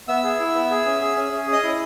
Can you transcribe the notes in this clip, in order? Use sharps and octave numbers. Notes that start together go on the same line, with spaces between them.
B3 E5 E6
G#4
E4
B3
G#4
C#4
G#4
C#4
C#4
G#4
D#5 D#6
E4